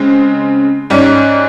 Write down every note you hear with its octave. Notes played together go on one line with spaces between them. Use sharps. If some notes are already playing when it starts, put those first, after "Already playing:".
Already playing: C#3 G#3 C4
G#2 G3 C#4